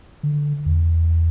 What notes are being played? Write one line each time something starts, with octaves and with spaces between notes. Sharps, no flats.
D3
E2